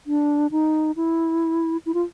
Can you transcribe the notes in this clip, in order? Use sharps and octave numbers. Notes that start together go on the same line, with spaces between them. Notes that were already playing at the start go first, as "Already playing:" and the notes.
D4
D#4
E4
E4
F4